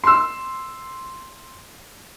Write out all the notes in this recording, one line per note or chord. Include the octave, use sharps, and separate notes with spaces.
C6 E6